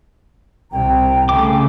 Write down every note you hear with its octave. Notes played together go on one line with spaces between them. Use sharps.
C2 C3 G5 A#5
C#3 A3 D6